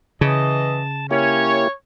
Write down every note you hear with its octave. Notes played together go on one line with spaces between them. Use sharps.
C#3 E3 D#5 A5
A#3 C#4 E4 G4 C#5